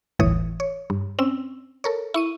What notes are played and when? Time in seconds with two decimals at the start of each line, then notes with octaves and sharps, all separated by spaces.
0.19 G1 D2 A2 E3 C#5 D#6
0.60 C#5
0.90 G2
1.19 C4 C#4 E6
1.84 A4 A#4 C#5
2.14 E4 C#6 D#7